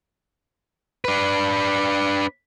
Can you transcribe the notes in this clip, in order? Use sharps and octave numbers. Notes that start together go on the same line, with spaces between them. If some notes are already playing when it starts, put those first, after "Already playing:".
D4 B4